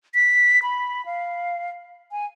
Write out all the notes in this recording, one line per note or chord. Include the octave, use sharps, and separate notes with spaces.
B6
B5
F5
G#5